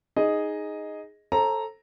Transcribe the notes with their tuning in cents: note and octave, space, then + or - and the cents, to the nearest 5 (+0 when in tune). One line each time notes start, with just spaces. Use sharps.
D#4 +0 G#4 +0 D#5 +0
A4 +0 C5 +40 A#5 +0